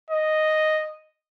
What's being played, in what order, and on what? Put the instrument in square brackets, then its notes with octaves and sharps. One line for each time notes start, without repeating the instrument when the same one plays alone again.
[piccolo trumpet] D#5